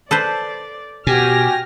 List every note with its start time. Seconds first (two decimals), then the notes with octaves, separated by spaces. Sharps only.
0.11 A4 B4 C5 D5
1.07 B2 F#4 G4 G#5 F6 A#6